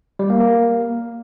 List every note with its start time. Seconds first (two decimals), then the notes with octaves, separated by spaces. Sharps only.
0.19 G3
0.30 A#3
0.40 A#3